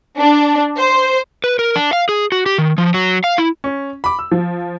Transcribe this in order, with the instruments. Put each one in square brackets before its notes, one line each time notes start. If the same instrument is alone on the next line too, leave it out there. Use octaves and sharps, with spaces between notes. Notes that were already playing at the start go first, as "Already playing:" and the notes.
[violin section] D4
C5
[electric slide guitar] B4
A#4
D4
F5
G#4
F#4
G4
D#3
F3
F#3
F5
E4
[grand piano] C#4
B5 D6
E6
[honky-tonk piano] F3